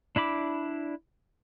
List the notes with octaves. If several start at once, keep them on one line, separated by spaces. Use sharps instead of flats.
D4 E4 B5 D6